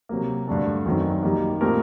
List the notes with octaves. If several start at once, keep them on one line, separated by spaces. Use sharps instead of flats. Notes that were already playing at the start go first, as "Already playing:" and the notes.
C3 F#3 A#3
G2 D3 A3 D4
F#2 D#3 F#3 C4
D#3 G3 A#3
A#2 A3 C4 G4 A#4